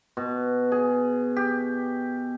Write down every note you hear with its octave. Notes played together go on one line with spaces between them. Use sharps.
B2
G#4
G4